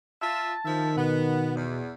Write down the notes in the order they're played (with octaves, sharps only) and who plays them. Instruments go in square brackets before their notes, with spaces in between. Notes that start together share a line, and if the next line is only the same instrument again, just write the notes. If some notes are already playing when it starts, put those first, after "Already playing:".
[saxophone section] F4 E5 [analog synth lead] A5
[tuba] D#3 [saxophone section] F3 E5
[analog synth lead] B2 [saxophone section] B3
[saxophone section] E2